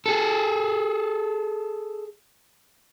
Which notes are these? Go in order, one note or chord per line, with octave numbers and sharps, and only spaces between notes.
G#4 A4